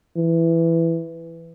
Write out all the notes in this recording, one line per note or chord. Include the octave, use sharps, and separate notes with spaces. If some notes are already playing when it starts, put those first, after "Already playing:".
E3